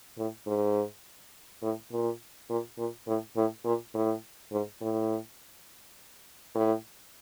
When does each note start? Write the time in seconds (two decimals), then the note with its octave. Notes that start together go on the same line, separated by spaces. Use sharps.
0.18 A2
0.47 G#2
1.63 A2
1.92 A#2
2.50 A#2
2.78 A#2
3.07 A2
3.36 A2
3.65 A#2
3.95 A2
4.52 G#2
4.81 A2
6.55 A2